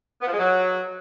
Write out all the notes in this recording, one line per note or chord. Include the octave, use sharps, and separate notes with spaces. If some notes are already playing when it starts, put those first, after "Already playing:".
B3
F3
G#3
F#3